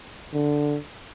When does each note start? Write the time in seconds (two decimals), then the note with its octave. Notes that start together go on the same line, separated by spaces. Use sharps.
0.33 D3